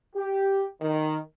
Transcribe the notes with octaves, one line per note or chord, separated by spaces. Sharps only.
G4
D#3